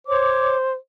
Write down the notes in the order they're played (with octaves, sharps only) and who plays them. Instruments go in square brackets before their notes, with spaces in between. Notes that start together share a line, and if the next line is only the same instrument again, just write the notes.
[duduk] C5 [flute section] C#5 D6